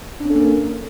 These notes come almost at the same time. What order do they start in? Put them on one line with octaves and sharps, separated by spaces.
D4 C#4 A4 A#3 A#4